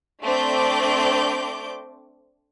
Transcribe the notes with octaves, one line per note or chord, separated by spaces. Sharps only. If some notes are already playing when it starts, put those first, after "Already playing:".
A3 C4 D4 D6 G6